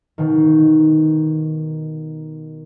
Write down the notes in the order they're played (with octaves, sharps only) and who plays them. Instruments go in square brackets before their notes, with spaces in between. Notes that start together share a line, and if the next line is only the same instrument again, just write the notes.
[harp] B2 D#3